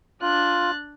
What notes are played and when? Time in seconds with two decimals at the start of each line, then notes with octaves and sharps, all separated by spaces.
0.22 D4 F4 F#6 A6